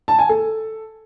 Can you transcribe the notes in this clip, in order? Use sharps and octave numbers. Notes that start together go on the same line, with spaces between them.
A5
G#5
A4